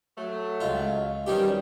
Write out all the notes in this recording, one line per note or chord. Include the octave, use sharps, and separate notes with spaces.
F#3 A3
C#2 F4 D#5
B2 D#3 G3 C#4 G4 D5